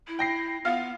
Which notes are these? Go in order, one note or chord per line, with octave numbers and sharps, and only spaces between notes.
E4
G5 A#6 C7
B3 F4 F5